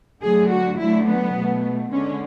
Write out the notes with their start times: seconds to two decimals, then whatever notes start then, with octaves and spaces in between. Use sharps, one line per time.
0.21 D3 F#3 A3 G#4
0.50 F#4
0.78 D3 F#3 A3 E4
1.06 B3
1.35 B2 A3
1.91 D3 G#3 C#4